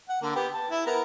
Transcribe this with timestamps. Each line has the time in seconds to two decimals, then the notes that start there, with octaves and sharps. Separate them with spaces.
0.09 F#5
0.22 D3 A#3
0.35 B3 G4
0.54 A5
0.70 E4
0.86 B3 A#4 A#5